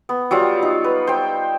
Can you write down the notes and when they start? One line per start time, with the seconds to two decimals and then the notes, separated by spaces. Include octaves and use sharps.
0.09 B3
0.31 F#3 G3 F4
0.62 D#4
0.84 B4
1.07 C5 G5